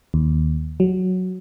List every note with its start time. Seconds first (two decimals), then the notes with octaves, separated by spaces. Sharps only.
0.14 D#2
0.80 F#3